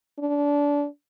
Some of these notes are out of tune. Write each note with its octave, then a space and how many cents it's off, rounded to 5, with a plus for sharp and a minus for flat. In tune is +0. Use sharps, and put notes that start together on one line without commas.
D4 -25